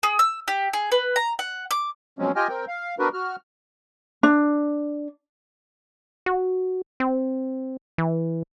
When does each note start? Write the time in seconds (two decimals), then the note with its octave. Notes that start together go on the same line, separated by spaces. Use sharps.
0.03 G#4
0.19 E6
0.48 G4
0.73 G#4
0.92 B4
1.16 A#5
1.39 F#5
1.71 D6
2.19 B2 F3 F#3 G#3 C4 C#4
2.36 F4 G4 D#5 G5 G#5 F6
2.49 C4 A#4 G5
2.68 F5
2.99 B3 D4 F#4 A#4 B4
3.13 F#4 F6
4.23 D4
6.26 F#4
7.00 C4
7.98 E3